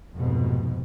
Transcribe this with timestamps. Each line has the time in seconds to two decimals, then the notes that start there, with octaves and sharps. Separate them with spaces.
0.15 F1 F2 G#2 B2